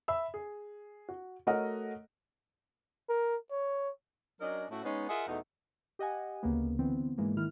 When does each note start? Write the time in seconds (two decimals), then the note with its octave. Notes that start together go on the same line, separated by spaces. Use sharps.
0.08 E5 B5 E6
0.34 G#4
1.09 F#4
1.47 A3 F#4 A#4 C#5 D#5 F#5
3.09 A#4
3.51 C#5
4.41 F#3 C#4 D4 A#4 D#5
4.71 A2 A3 C#4 E4 F#4
4.84 G#3 B3 C#4 D#4
5.09 F4 G#4 A#4 D#5 E5 F#5
5.28 E2 B2 A3 D#4
5.99 G4 D#5 F#5 G#5
6.43 D2 C#3 A#3 B3
6.79 D3 E3 B3 C4
7.18 G#2 E3 G#3 A#3
7.37 D#3 E4 F6